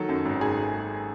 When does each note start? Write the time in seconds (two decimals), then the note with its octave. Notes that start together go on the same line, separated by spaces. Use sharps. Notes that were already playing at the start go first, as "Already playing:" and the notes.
Already playing: D#3 F#3 A4
0.09 F#2
0.25 G#1
0.41 D#3 G#4